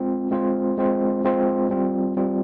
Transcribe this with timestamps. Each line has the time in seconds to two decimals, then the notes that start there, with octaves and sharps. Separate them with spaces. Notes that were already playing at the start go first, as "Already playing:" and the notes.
Already playing: G#3 C4 F4 C5
0.31 G#3 C4 F4 C5
0.78 G#3 C4 F4 C5
1.24 G#3 C4 F4 C5
1.70 G3 C4 F4
2.17 G3 C4 F4